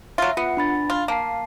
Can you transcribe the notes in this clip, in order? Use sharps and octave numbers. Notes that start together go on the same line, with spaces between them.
F#3 F4 E5
B3 F4 F#5 C#7
D4 B5 A6
F4
A#3 F5 A5 C7